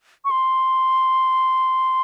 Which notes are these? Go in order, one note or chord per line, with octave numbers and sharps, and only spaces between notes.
C#6
C6